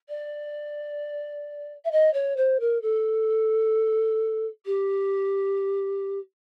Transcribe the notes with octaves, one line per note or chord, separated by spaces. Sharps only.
D5
E5
D#5
C#5
C5
A#4
A4
G4